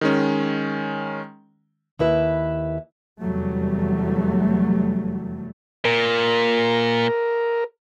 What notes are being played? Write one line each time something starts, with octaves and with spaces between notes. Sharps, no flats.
D#3 G#3 C#4
D#2 E4 B4 E5
F1 E2 F#3 G3 A3
A#2 A#4